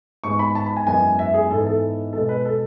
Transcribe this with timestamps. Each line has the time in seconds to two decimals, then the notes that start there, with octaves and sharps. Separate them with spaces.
0.24 G#2 G#3 B3 C#6
0.39 B5
0.55 A5
0.66 B5
0.77 G#5
0.87 F#2 E3 G#3 B3 G#5
1.19 E5
1.34 G#4
1.50 G#2 E3 B3 A4
1.66 A4
2.13 B2 G#3 B3 A4
2.29 B4
2.45 A4